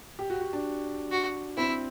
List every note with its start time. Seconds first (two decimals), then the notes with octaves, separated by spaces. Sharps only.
0.19 G4
0.30 F#4
0.41 F#4
0.53 D4
1.11 F#4
1.57 C4 E4